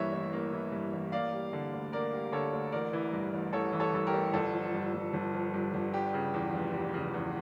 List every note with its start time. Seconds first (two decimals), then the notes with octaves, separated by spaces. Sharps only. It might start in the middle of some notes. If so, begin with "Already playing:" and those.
Already playing: G2 E3 A#3 C#5 E5
0.13 A1
0.33 A#3
0.52 E3
0.72 G2
0.92 A1
1.12 A#3 D5 F5
1.33 G3
1.53 D3
1.73 D2
1.93 A#3 A#4 D5
2.13 G3
2.32 D3 A4 C#5
2.53 D2
2.72 A1 A#4 D5
2.93 E3
3.13 G2
3.33 A1
3.53 A1 A4 C#5
3.73 E3
3.80 A4 C#5
3.93 G2 A4
4.07 G4 A#4
4.14 A1
4.33 G1 A4
4.54 F3
4.74 G2
4.93 G1
5.13 G1
5.34 F3
5.54 G2
5.74 G1
5.94 G3 G4
6.14 C#3
6.34 E2
6.54 F1
6.74 G3
6.94 C#3
7.14 E2